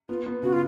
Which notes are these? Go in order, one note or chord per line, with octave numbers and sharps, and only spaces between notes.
B3 F4
B3
C#3 F#4
F4